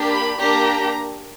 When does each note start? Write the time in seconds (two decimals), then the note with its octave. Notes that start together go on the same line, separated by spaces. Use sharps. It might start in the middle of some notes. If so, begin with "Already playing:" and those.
Already playing: A#3 D4 G4
0.10 B5
0.39 A#3 D4 G4 A#5